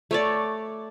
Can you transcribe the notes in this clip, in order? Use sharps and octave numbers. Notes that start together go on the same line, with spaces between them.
A3 C#5 D5